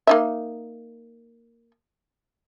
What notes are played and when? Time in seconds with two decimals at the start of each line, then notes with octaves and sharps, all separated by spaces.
0.07 A#3 D#4 E5